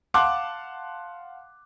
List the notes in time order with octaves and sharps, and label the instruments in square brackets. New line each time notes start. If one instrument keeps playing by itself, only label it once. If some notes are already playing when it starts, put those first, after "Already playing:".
[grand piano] F5 F#5 A5 C6 D6 F#6